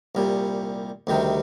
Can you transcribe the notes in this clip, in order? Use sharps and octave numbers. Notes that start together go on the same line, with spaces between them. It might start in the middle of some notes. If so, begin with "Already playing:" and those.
C2 A#2 G3
D2 C3 D#3 G3